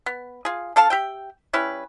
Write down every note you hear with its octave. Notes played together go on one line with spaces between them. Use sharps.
B3
F4 G#4
D4 A4 F5 A5
G4 E5 G5
G3 C#4 E4 B4